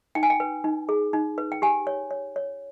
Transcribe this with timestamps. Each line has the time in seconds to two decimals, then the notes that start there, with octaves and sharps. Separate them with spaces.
0.15 D#4 G5
0.23 G#5
0.30 G5
0.40 B4
0.64 D#4
0.89 G#4
1.13 D#4
1.38 B4
1.52 G5
1.62 G4 G#5
1.87 C#5
2.11 C#5
2.36 C#5